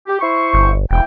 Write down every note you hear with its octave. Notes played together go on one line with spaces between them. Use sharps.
G4
E4 C5 C#6
G1
E1 E3 A#3 G5